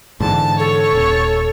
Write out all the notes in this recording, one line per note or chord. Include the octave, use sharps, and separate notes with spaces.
G#2 D3 E3 A5
A4 C#5
D#1